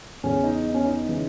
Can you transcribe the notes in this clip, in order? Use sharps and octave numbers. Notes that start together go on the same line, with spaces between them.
E2 C#3 E3 C#4
D#4
C#4
D#4
C#3 E3